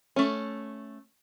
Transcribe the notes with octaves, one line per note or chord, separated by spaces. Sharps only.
A3 C#4